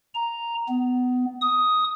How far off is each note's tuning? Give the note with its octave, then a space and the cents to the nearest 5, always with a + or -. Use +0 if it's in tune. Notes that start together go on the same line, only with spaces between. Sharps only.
A#5 +0
B3 +20
D#6 +5